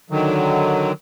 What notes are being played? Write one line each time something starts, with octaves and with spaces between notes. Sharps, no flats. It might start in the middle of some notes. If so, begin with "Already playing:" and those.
D3 D#3 F#3